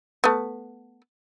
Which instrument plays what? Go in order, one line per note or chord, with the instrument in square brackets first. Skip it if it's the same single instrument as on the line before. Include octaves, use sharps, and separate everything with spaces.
[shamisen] A3 B3